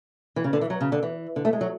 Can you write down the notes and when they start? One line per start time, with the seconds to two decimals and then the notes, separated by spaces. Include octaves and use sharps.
0.36 E3
0.44 C#3
0.53 D3
0.61 E3
0.70 F#3
0.81 C#3
0.92 D3
1.03 E3
1.36 D3
1.45 A3
1.53 G#3
1.61 F#3